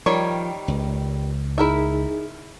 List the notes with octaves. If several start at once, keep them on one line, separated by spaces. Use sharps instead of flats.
D#3 F3 G3 C#5
C#2
D#4 E4 G#4 A#4 E5